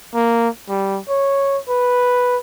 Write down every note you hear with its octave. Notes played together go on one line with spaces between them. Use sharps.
A#3
G3
C#5
B4